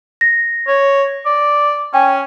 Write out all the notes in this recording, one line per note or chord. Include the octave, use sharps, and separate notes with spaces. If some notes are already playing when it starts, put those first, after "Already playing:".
A#6
C#5
D5
C#4 G5 G#5